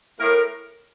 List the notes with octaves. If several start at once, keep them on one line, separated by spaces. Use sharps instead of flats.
A2 A#4